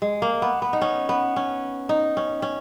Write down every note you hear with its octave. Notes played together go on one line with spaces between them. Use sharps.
G#3
A#3
B3
B3
D#4
C#4
B3
C#4
D#4
C#4
C#4